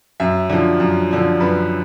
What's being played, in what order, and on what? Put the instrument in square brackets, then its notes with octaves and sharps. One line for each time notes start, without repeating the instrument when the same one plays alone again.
[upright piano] F#2 E5
D3 F3
F#2
D3 F3
F#2 B4